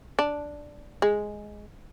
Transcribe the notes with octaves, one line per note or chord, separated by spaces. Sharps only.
D4
G#3